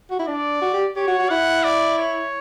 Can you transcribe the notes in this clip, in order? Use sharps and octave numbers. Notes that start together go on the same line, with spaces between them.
F#4
E4
D4 D5
F#4
G4
G4 C#5
F#4
F#4
E4 F#5
D5
C#5